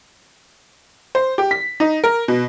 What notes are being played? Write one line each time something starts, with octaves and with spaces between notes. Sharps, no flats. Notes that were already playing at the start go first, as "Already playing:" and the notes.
C5
G4
B6
D#4
A#4
B2